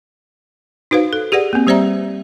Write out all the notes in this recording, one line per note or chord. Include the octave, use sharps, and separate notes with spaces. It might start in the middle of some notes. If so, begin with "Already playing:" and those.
D#4 F#4 B4 C5 F5
A4
G4 G#4 B4 D5 F#5
A#3 C4
G3 G4 C5 D5 E5 A#5